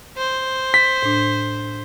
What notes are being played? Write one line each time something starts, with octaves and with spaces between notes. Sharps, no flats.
C5
B6
A2 D4